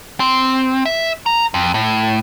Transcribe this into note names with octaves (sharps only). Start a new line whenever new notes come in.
C4
E5
A#5
F2
A2